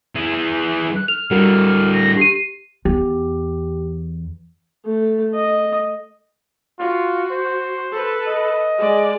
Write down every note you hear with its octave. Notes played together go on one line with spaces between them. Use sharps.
E3 G#4
F#6
F6 F7
A2 D3 G3 F#4 A#4
A#6
G4 C7 D#7
E2 G4
A3
D#5
F4 F#4
C5
A4 B4
D#5
G#3 D5